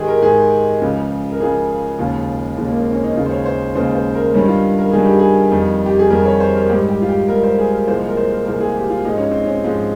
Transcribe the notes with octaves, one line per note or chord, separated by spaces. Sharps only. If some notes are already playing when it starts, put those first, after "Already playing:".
Already playing: G#2 D#3 G#3 G4 G#4
A#4
G#2 D#3 G#3 G#4
C#2 C#3 F3
A#4
C#2 C#3 F3 G#4
D#2 C#3 F3 G#3
D#2 C#3 F3 G#3
A#3
C4
C#4
D#4
D#2 C#3 G#3 F4
C5
C#5
C5
D#2 C#3 G#3 C5
C5
A#4
G2 D#3 G3 C#4
F4
A#4
G2 D#3 G3 G#4
G4
G#4
F2 D#3 G3
G4
G#4
F2 D#3 G3 A#4
C#5
C5
A#4
G#2 G3 G4
G4
F4
G4
G#2 G3 A#4
C5
G#4
A#4
C2 A#2 F3 G#3 C5
A#4
C5
A#4
C2 A#2 F3 G#3 A#4
G#4
G4
F4
G#2 F3 G#3 D#4
C#4
C4
C#4
G#2 F3 G#3